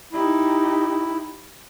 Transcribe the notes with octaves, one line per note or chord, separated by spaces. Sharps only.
D#4 E4 G4